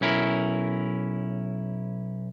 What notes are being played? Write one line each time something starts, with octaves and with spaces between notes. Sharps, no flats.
B1 C#4 E4 A#4